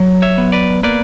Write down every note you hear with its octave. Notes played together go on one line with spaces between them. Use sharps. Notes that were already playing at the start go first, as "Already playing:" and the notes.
Already playing: F#3
C#5 E5
B3
B4 D5
A#3 B4 D5